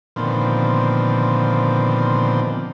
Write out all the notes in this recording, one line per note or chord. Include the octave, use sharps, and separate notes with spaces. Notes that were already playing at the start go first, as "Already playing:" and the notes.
A#2 D3 D#3 F3 B3 C4